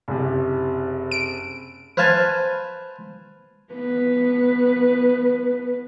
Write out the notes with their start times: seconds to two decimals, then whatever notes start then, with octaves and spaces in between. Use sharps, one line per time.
0.08 F#1 C3
1.11 D7
1.97 B4 C5 F5 G#5 A5 C6
3.73 B3 B4